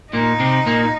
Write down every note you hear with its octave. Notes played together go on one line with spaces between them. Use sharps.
A#2 A#3 D#4
C3 C4
A#2 A#3